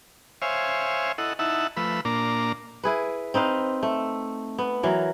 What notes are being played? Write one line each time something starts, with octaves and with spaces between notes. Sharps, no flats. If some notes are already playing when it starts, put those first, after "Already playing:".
C5 C#5 E5 F5 G#5
E4 A4 D#5 F#5
D#4 E4 E5 F#5 A5
F3 A3 B4 B5 E6
A#2 A#3 D4 A#5 D6
E4 G#4 B4
C4 D#4 B4 F5
A3
B3
E3 F#3 A#4